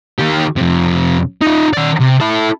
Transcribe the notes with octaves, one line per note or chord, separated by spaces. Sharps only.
D#3 G4
F2 C3
D#4 F4
D#3 D5
C3
E4 A4